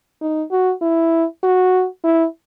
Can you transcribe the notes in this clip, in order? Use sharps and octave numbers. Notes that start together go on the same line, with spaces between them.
D#4
F#4
E4
F#4
E4